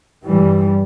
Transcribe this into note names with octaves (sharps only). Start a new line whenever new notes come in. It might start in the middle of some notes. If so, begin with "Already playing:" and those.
G2 E3 G3